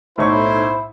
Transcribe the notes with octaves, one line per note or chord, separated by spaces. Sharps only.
B1 A2 A3 D#4 E4 C5 C#6